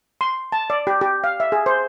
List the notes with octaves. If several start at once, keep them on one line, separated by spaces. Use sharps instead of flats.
C6
A5
D5
G4
G4
F5
E5
G#4
C5